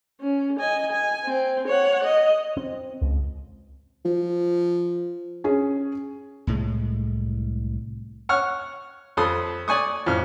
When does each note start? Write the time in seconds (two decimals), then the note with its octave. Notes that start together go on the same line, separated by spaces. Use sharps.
0.20 C#4
0.59 D#5 G#5
0.92 G#5
1.24 C4
1.67 C#5 F#5
2.04 D#5
2.57 C4
3.02 C#2
4.05 F3
5.44 C#4 G#4
6.47 C2 A2 G#3
8.29 C#5 F#5 C#6 F6
9.17 F2 A4 B5 C6 D#6
9.68 D5 G#5 C#6 D#6
10.06 F2 A2 F6